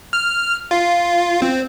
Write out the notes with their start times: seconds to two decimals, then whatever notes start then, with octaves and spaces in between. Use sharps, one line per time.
0.13 F6
0.71 F4
1.42 C4